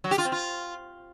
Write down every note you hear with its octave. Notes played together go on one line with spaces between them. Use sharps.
F#3
G4
F4
C4
F4